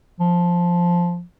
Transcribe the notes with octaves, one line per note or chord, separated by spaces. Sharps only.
F3